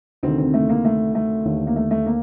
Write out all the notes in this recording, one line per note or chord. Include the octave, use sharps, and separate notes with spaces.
D2 C3 D#3 C4
C4
A3
A#3
A3
A3
D#2 D3
A#3
A3
A3
A#3